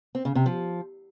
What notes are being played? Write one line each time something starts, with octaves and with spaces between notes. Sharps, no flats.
C4
C#3
C3
F3